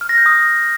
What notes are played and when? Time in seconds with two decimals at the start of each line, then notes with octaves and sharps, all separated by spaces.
0.01 F6
0.09 A#6
0.18 G6
0.26 D#6